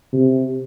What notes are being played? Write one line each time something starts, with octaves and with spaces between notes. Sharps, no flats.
C3